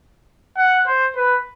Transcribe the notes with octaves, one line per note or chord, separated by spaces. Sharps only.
F#5
C5
B4